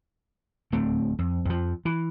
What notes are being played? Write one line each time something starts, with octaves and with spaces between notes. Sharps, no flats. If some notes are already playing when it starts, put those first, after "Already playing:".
D1 A3 C4
F2
F2 F3
E3